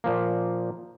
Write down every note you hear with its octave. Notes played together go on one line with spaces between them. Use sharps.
A#2 F3 A#3